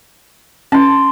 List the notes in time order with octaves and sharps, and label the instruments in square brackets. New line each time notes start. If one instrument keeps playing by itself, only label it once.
[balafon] C#4 [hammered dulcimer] A5 C6